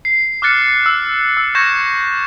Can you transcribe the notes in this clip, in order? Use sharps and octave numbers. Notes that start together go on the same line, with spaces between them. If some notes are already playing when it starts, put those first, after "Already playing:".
C7
D6 F6 F#6 A6 C#7
E6
E6
C#6 G6 G#6 A#6 C#7 E7